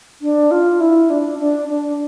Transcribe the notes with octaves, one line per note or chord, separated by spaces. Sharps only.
D4
F4
E4
D4
D4
D4